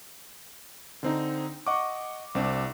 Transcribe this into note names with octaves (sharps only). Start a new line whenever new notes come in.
D3 C4 D#4
D#5 F#5 C#6 D6
C2 C4 D4